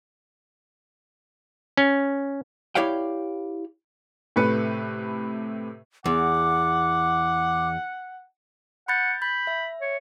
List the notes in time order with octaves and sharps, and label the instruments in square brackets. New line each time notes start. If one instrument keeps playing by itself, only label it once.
[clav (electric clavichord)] C#4
[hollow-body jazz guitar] E4 G4 C#5 D5 F5 G5
[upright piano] A2 C3 A3 B4 C#7
[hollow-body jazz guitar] E2 [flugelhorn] F#5 [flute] D6
[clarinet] F#5 [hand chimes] B5 G6 A6
[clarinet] B5 [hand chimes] G6
[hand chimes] E5
[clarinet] C#5